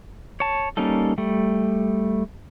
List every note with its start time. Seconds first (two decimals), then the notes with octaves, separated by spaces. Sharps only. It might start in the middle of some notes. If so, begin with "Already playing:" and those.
0.40 C#5 A5
0.77 G3 A#3 C#4 D#4 A4
1.18 G3 A3